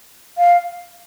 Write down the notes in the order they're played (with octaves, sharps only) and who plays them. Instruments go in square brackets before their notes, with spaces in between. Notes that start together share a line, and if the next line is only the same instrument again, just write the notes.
[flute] F5